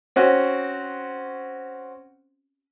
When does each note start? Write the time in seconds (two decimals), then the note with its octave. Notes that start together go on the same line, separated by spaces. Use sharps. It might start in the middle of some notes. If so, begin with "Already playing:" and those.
0.16 C4 C#4 F#4